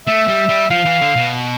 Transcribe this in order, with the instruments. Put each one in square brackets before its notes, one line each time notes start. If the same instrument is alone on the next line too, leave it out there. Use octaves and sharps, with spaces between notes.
[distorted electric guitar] A3 [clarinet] E5
[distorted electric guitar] G3
G3
[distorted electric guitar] F3 [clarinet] F5
[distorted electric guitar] E3
D3
B2